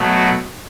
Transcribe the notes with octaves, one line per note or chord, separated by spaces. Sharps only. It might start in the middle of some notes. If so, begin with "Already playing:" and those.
Already playing: B2 F#3 A3
F#4